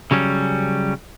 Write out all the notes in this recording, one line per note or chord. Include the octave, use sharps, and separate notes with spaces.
C#3 F#3 G3 C#4